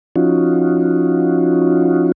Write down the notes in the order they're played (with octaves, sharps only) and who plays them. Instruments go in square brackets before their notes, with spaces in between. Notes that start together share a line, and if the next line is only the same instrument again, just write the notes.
[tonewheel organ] F3 C#4 D#4 F4 F#4